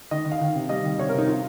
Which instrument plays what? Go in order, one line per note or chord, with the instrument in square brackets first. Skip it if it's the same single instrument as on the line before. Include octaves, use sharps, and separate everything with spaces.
[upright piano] D#3 D#5
D#3
F5
D#3
C3
G3 D#5
D#3
C3 C#5
A#4
C3 D#4
F4